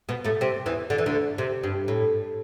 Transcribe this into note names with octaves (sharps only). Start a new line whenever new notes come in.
B2 B3
A2 A3
C3 C4
E2 E3
D3
E3
D2 D3
C3
G2
A2